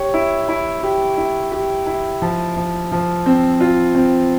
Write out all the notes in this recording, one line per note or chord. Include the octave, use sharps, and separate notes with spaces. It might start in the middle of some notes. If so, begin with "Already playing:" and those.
Already playing: G4 C#5
E4
E4
G4
E4
G4
E4
F3
F3
F3
C4
F4
C4